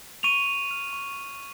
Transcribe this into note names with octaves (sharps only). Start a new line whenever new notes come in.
C#6 D#7 F7
C#6
F6
C#6
C#6